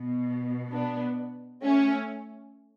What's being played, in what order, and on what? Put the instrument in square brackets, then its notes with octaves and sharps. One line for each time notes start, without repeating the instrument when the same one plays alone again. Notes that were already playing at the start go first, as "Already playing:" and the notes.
Already playing: [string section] B2
B3 D4
A3 C#4